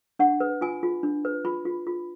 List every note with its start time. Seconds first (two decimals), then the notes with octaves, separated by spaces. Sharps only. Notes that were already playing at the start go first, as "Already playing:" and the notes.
0.19 D4 F#5
0.40 B4
0.61 F4 G#5
0.83 F4
1.03 D4
1.25 B4
1.45 F4 B5
1.65 F4
1.87 F4